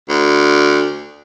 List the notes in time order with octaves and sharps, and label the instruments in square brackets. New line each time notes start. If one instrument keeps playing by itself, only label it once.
[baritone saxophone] D2